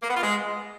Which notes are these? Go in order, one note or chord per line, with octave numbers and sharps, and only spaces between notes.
A#3
B3
F4
G#3